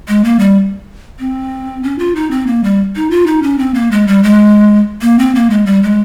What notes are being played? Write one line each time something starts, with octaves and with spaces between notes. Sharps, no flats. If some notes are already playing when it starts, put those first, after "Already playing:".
G#3
A#3
G3
C4
C#4
F4
D#4
C4
A#3
G3
D#4
F4
D#4
C#4
C4
A#3
G#3
G3
G#3
A#3
C4
A#3
G#3
G3
G#3